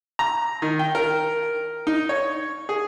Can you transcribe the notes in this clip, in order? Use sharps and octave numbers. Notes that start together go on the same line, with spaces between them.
A#5
D#3
G5
A#4
D#4
C#5
G#4